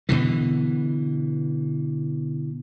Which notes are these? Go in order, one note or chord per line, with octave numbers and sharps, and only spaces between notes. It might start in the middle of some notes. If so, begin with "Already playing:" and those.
B2 D3 E3